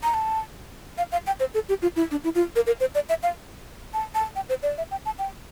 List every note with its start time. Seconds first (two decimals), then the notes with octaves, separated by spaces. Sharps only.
0.03 A#5
0.14 A5
0.98 F5
1.12 F5
1.27 G5
1.40 C5
1.54 A4
1.69 G4
1.82 F4
1.96 E4
2.11 D4
2.24 E4
2.35 F4
2.56 A#4
2.67 A#4
2.80 C5
2.95 D5
3.09 E5
3.23 F5
3.94 A5
4.15 A5
4.36 G5
4.49 C5
4.63 D5
4.78 E5
4.91 G5
5.06 A5
5.19 G5